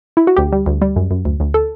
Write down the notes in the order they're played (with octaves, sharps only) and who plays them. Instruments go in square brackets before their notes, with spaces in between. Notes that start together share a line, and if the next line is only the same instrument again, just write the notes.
[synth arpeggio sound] E4
F#4
D2 G4
G3
D2
G3
F#2
F#2
D2
D2
A4